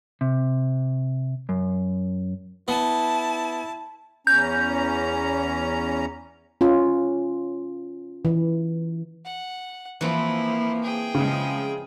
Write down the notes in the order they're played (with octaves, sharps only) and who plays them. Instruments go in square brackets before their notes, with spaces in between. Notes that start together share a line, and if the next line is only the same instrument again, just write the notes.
[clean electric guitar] C3
F#2
[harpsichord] B3 [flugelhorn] E4 [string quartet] A5
[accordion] E2 C#4 A#5 [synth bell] G6
[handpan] C#4 F4
E3
[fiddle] F#5
[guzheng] E3 C4 [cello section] F3 A#3 [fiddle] E4
[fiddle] G#4 G5
[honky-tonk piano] C#3 [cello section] F3 G#3